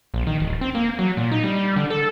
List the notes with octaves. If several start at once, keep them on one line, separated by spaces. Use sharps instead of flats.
A#1
D#3
D1
C4
A#3
F#3
A#2
D#4
G3
G3
D3
A4